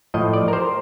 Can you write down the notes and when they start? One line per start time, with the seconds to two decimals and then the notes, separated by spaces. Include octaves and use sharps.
0.14 A2 F3 D#5
0.34 D5
0.48 A#4
0.53 C5